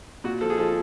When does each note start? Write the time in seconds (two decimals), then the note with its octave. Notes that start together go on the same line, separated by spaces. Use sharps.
0.24 A#2 F#4
0.41 F3 A4
0.50 G#4
0.58 F3 A4